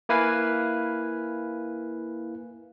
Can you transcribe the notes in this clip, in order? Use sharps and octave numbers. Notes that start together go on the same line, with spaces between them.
A#3 E4 B4 F5 G#5